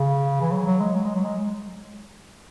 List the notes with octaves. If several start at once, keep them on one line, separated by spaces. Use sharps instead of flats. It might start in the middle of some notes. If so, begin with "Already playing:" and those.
Already playing: C#3
E3
F#3
F#3
G#3
F#3
G#3
F#3
G#3